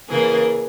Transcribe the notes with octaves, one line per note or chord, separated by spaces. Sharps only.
C#3 E3 A#3 G#4